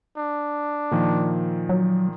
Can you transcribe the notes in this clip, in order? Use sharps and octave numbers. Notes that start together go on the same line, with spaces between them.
D4
A#2 D#3 F3
F#3